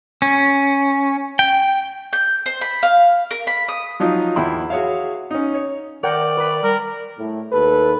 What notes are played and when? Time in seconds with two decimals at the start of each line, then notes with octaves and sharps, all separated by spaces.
0.22 C#4
1.39 G5
2.13 G6
2.46 C5
2.61 B5
2.83 F5
3.31 A#4
3.47 B5
3.68 D#6
4.00 F3 F#3 D#4 F4
4.36 E2 E4 G5 B5 C6
4.70 F#4 G#4 C#5 E5 F5
5.31 C#4 D#4
5.54 C#5
6.03 D#3 A#4 D5 F#5 G5
6.37 B4 B5
6.63 G3 A#4
7.18 A2
7.52 D#2 A4 B4